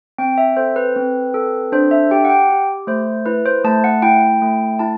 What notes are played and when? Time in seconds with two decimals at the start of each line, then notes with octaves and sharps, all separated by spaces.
0.18 C4 G5
0.38 E5
0.57 A4 C5
0.76 B4
0.96 C4
1.34 A4
1.72 D4 C5
1.91 E5
2.11 G4 G5
2.25 F#5
2.29 G5
2.49 G4
2.87 A3 C5
3.26 E4 B4
3.46 C5
3.64 A3 A5
3.84 F#5
4.02 E4 G5
4.42 A3
4.79 E4 A5